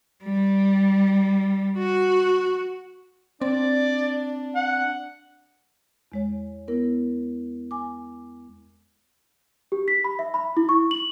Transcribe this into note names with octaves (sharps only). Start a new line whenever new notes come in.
G3
F#4
C4 D4 D5
F#5
E2 G#3 C#5
B3 E4 A#4
G#5 D6
G4
B6
B5
E5
B5
E4
C#6
F#7